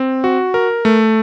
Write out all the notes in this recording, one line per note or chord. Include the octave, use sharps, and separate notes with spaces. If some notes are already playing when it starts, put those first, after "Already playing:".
Already playing: C4
F#4
A#4
A3